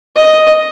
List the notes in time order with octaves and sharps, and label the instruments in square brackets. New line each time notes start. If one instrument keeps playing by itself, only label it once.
[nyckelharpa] D#5